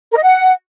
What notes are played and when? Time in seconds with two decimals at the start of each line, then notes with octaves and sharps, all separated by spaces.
0.11 A#4
0.17 D#5
0.22 F#5